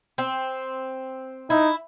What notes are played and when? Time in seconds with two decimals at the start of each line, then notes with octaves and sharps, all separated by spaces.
0.18 C4
1.50 D#4 E4